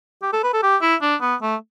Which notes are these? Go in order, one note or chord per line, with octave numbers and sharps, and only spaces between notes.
G4
A4
B4
A4
G4
E4
D4
B3
A3